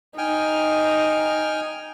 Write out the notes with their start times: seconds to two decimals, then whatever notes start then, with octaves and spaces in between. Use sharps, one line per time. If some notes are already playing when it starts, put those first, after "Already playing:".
0.18 D#4 G5 G#5 F6